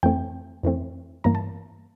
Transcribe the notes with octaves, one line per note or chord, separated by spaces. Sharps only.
F2 E3 A3 C4 G5
F2 E3 A3 C4
G2 E3 A#3 A#5
A5